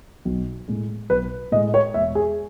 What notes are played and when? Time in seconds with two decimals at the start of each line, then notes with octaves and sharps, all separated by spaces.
0.25 B1
0.68 A2 G#3
1.10 B1 B4
1.52 A2 G#3 D#5
1.74 C#5
1.94 E1 E5
2.15 G#4